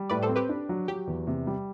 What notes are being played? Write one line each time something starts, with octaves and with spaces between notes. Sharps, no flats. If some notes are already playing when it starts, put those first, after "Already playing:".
Already playing: G3
A2 B4 D5
A4 C5
C4
G4 B4
D4
F#3
F#3 G4
E2
C3
G3